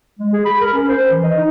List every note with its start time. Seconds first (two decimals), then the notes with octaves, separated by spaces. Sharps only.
0.19 G#3
0.33 G#4
0.45 B5
0.60 A#4
0.73 C#4
0.88 C5
1.11 E3
1.23 D#5
1.37 D#4